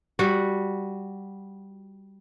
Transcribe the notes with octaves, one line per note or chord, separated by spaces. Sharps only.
G3 F#4